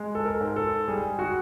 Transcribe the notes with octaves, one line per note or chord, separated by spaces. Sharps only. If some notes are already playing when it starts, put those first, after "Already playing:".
Already playing: G#3
A4
A#4
G#2
A4
G3 G#4
F#4